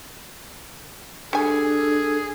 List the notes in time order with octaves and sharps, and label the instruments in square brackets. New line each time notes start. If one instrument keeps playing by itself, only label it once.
[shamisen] G3 G#5 [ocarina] D4 [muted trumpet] G#4 [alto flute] A4